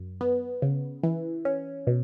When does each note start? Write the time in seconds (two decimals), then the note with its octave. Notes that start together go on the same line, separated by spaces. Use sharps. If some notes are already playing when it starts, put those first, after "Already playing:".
Already playing: F#2
0.21 B3
0.62 C#3
1.03 E3
1.45 C#4
1.87 B2